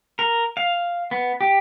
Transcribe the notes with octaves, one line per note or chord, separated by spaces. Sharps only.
A#4
F5
B3
G4